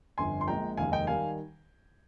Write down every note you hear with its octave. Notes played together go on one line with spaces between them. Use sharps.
G1 F2 D3 G#5 C6
C6
A#1 A#2 G#3 G5 A#5
F1 D#2 D#3 G#3 F5 G#5
D#5 G5
D#3 G3 F5 G#5